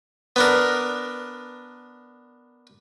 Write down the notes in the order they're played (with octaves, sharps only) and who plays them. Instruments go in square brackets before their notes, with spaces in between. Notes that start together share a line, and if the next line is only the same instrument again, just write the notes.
[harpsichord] B3 D4 A#4